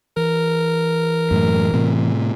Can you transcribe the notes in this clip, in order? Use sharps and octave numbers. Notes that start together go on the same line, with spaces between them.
E3 A#4
F#2 A2
A2 C3